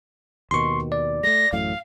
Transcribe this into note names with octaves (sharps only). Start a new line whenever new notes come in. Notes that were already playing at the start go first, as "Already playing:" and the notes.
D#2 B2 D#3 C6 C#6
D5
G#3 A3 A#6
A1 F#2 A2 F5